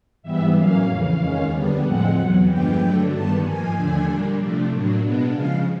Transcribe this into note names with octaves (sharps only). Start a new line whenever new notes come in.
G#2 E3 G3 B3 E5
A2 F#3 A#3 C#4 F5
F2 C#3 E3
D#2 D#3 G#3 C#4
F2 D3 G3 B3 D4
A2 F3 G#3 C4 F#5
E2 B2 F#3
G2 D3 F3 G#3 B3 G5
D3 F#3 A3 D4
G2 D#3 G3 B3 A5
G#2 F3 A#3 G#5
D#2 D3 F3 A3 D4
A#2 G3 A#3 D4
C3 F3 A3 D4
A2 F#3 A#3 D4
B2 G#3 B3 D4
C#3 F3 G#3 F5